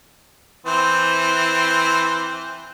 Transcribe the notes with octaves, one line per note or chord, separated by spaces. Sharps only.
E3 C4 C5